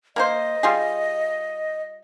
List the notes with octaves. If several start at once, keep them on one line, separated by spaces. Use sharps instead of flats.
A#3 A#4 C5 D#5
G3 F4 G#4